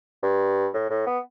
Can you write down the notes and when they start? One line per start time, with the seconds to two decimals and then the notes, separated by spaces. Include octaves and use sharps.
0.23 G2
0.74 A2
0.90 A2
1.06 B3